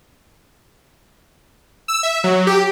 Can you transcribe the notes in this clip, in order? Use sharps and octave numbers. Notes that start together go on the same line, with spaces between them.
E6
E5
F#3
G4